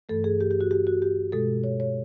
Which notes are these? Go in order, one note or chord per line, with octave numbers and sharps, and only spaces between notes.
G2 E3 A3 A4
G#4
G4
G4
F#4
G4
F#4
G4
B2 G#3 A4
C#5
C#5